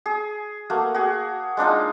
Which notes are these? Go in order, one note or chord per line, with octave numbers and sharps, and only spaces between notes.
G#4
A3 A#3 F#4
F#4 G#4
G#3 D4 D#4 F4